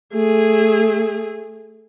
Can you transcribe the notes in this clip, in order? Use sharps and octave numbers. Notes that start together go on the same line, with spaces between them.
A3 G#4